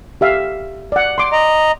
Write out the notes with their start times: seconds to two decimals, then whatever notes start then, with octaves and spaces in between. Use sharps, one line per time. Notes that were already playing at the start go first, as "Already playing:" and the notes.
0.21 G4 E5 F5
0.92 D5 F#5
1.18 C6 D6
1.33 D#5 A#5